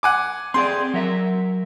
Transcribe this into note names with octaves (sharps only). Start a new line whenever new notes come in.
F#5 G#5 D6
C4 G#4 D5 C6
F#3 A#4 E5